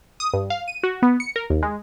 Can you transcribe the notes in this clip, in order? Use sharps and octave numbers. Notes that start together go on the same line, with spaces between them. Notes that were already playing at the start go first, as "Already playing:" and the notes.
D#6
G2
F5
D#7
F#4
B3
C#7
A#4
D#2
G#3